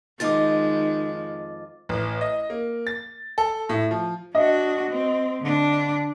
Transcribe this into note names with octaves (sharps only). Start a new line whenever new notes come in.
F2 D#3 G#3 D#4 F4 D#5 D6 A6
A1
D#5
A#3
A6
A4
A2
F3
D4 F#4 D#5
C4
D3 D4